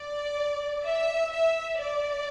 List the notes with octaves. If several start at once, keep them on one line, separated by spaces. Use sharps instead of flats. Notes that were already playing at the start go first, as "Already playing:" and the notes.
Already playing: D5
E5
E5
D5